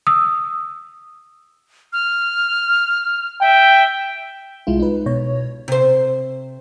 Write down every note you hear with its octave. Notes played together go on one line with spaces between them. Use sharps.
D#6 E6
F6
E5 G5
C2 G#3 E4 F4
D#4 B4
B2 C#5
C3 C5